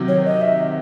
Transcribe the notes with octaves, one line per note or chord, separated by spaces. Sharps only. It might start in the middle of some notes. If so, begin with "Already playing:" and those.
Already playing: C3 D#3 F#3
C#5
D#5
E5